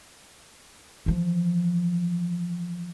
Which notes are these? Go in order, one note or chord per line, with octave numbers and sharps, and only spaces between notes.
E3 F3